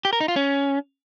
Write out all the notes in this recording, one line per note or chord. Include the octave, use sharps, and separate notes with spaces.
G4
A#4
D#4
F4
C#4